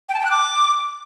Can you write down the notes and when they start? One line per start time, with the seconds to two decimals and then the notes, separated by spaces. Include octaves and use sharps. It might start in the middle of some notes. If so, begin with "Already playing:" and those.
0.09 G5
0.14 A5
0.20 G5
0.25 F#6
0.30 D6